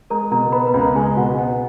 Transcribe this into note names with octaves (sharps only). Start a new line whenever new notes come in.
G#3 A#4 A#5
B2 A#4 A#5
B3 B4 B5
B4 B5
C#2
A#4 A#5
G#3 G#4 G#5
B2 F#4 F#5
B3